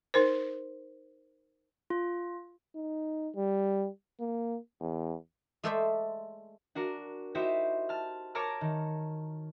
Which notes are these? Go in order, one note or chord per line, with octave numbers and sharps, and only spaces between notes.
D#4 A#4 C5
F4
D#4
G3
A#3
E2
G#3 A3 A4 C5 D5 E5
D4 F#4 A#4
D#4 E4 F#4 G4 C5 E5
A5 F6
A#4 C#5 A5 A#5 D6 F6
D#3